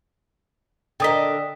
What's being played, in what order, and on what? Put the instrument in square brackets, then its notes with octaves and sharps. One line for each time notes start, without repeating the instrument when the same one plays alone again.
[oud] D3 A#4 D#5 [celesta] G5 D#6 B6